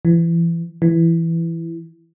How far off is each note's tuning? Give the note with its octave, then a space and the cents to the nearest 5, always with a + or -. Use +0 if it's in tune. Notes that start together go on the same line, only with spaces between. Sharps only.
E3 +30
E3 +10